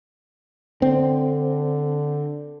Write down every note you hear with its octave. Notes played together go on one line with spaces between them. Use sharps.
D3 C4